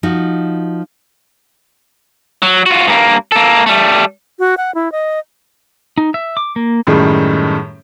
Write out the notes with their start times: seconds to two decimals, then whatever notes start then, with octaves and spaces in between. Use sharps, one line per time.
0.03 F3 D#4 F#4
2.42 F#3
2.66 F4 F#4
2.88 G2 A#3
3.32 A#3 A4
3.66 G3 A3
4.39 F#4
4.57 F#5
4.75 E4
4.92 D#5
5.98 D#4
6.14 E5
6.37 D6
6.56 A#3
6.87 F#2 A2 D#3 G3 G#3